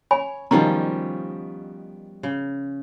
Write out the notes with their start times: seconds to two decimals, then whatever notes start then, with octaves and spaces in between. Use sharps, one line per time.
0.11 C#5 G#5 B5
0.51 B2 D#3 F3 G3 C#4 A#5
2.23 C#3